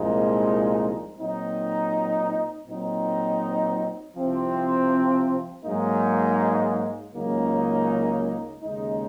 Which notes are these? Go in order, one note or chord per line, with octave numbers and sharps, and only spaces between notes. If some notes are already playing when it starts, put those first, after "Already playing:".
Already playing: C2 A#2 F3 G#3 D#4
A#2 F#3 C4 D#4
A#2 F#3 C4 D#4
C2 C3 F3 C4
G#2 F#3 A#3 D#4
C#2 C#3 F#3 A#3 D#4
D#2 C#3 G#3 D#4